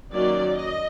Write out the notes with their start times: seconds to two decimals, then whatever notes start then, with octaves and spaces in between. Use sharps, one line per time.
0.13 D#3 F#3 A#3 C#4 D5
0.56 D#5